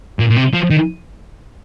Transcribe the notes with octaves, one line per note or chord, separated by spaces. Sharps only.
A#2
A#2
C3
F3
D#3